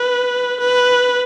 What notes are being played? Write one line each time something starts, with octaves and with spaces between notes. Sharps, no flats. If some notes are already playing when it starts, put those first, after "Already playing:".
Already playing: B4
B4